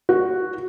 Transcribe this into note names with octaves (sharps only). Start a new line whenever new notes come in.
F#4